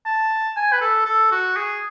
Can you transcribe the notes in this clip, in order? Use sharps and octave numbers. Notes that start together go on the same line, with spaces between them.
A5
G#5
B4
A4
A4
F#4
G#4